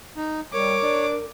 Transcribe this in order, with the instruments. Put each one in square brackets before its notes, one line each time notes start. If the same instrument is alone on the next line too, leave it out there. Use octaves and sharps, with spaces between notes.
[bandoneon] D#4
[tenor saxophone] G3 [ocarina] A#4 [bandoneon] C#5 [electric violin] D6
[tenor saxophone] D4